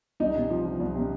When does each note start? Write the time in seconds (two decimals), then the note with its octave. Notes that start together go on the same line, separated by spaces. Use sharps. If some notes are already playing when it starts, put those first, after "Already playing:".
0.20 C2 D#4
0.35 C3
0.50 F3
0.65 F3
0.80 C2
0.95 C3